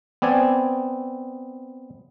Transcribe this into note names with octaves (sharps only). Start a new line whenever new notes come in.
B3 C4 D5 G#5